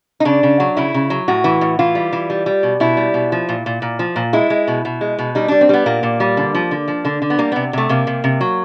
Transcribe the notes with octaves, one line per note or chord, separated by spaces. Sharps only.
D#4
C#3 D4
C#3
F#3
C#3 E4
C#3
F#3
A2 F#4
E3
A2
E3 F4
G3
E3
G3
G3
B2
B2 E4
G3
B2
F3
A#2
A#2
A#2
F3
A#2
G#3 E4
G#3
B2
B2
G#3
B2
G3 D#4
G3 D4
C4
G3 B3
A#2 A#3
A#2
G3
D3
F3
D3
F3
D3
D3
B3
G3 A#3
C3 B3
C3 A3
C3 A#3
C3
C3
F#3